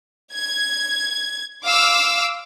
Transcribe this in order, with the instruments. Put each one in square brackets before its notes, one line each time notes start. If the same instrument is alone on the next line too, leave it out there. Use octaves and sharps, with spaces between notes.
[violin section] G#6
F5 C6 D6 E6